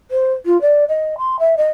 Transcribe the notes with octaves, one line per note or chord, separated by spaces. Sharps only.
C5
F4
D5
D#5
C6
E5
D#5